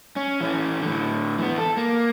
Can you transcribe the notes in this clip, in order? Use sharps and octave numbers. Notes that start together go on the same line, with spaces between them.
C#4
E3 C#4
A2 D3
E3 B3
A4
A#3